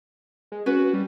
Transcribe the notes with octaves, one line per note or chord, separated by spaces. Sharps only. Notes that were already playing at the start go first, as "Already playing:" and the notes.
G#3
C#4 F#4 B4
G3